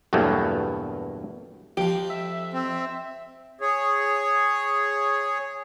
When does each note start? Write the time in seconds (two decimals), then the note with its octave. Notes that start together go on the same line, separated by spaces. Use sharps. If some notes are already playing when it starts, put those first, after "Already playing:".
0.13 E2 G2 B2 F#3 A3 A#3
1.77 F2 F3 G4
2.10 E5
2.53 C4
3.61 G#4 C#5